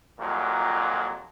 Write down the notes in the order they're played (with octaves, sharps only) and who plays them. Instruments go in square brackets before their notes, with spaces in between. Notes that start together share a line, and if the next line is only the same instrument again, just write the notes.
[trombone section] C2 F2 A#2 D#3 F#3